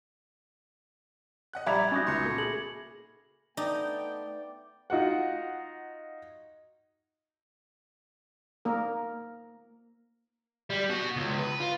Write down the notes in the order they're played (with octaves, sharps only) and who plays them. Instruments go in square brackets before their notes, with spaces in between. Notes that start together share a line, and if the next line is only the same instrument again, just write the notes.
[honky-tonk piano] D#5 F#5 F#6
[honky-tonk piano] A#1 G3 D5 [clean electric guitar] E5 A#5 [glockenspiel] B5 D6 G#6
[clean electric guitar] C#4 D#4 F#4 [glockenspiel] A6 A#6
[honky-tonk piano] C#2 C6 [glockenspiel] A#6 C#7
[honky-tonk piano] A#2 A3
[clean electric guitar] G#4 [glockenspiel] F#7
[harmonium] A3 B3 [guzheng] D#4 [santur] D5 [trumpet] G5
[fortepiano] D#4 F4 F#4 F#5
[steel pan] A#3 A#4
[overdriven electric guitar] G3
B3 F#4
C#2
B4
F4